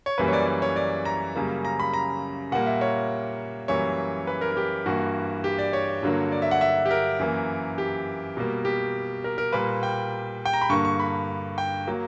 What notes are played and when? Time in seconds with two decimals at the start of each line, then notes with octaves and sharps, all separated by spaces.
0.06 C#5
0.18 F#2 E3 G3 A#3 B4
0.28 C#5
0.33 D5
0.47 D5
0.62 C#5
0.76 D5
1.05 A#5
1.36 F#2 C#3 G3 A#3
1.65 A#5
1.80 B5
1.94 A#5
2.52 A#2 G3 A#3 F#5
2.66 E5
2.81 C#5
3.68 F#2 E3 G3 A#3 C#5
4.27 B4
4.41 A#4
4.51 A#4
4.57 G4
4.86 G2 E3 A#3 F#4
5.44 G4
5.59 D5
5.73 C#5
6.03 G2 D3 F#3 A#3
6.32 D5
6.42 E5
6.51 F#5
6.61 E5
6.86 G4
6.91 A#4
7.19 F#2 E3 A#3
7.78 G4
8.37 B2 G3 A#3
8.65 G4
9.24 A#4
9.38 A#4
9.52 A#2 G3 A#3 B4
9.83 G5
10.45 G5
10.53 A#5
10.62 B5
10.70 G2 D3 A#3 C#6
10.85 C#6
11.00 B5
11.58 G5
11.87 F#3 A#3